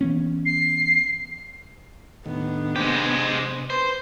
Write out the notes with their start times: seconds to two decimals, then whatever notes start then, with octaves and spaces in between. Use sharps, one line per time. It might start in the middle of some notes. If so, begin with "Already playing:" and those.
0.01 E3 B3 C#4
0.46 C7
2.26 D#2 A2 D#3 B3 D4
2.76 C3 G#3 G4 C5
3.70 B4 C5